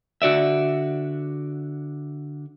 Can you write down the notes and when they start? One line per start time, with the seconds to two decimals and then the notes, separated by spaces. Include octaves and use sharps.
0.22 D3 F#4 D5 E5